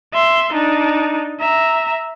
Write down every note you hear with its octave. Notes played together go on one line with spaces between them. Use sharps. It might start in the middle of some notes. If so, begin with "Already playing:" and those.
E5 C6
D4 D#4
E5 A#5